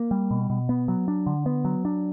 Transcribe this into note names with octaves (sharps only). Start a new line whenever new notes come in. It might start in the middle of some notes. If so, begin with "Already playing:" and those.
Already playing: A#3
G3
B2
B2
B3
F#3
D4
D3
B3
F#3
D4